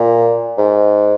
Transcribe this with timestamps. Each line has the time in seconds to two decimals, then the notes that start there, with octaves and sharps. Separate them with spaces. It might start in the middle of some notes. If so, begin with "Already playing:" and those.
Already playing: A#2
0.58 G#2